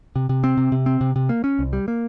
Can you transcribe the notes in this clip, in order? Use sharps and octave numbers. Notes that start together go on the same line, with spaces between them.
C3
C3
C4
C3
C3
C4
C3
C3
A#3
C#4
C2
G3
A#3